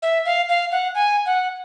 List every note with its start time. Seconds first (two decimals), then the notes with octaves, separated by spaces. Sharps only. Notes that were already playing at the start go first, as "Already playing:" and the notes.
0.02 E5
0.26 F5
0.49 F5
0.72 F#5
0.95 G#5
1.26 F#5